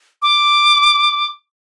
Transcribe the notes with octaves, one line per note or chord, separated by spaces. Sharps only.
D6